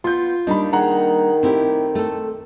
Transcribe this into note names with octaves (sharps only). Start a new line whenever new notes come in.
B3 F4 C6 G6
G3 A#3 D4 D#4 B5
D#3 G#4 F#5 A#5
A3 C4 E4 G4
A3 A4